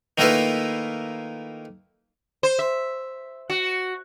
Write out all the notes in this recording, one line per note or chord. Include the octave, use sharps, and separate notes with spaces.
D#3 A3 A#3 E4 F4 B4
C5
E5
F#4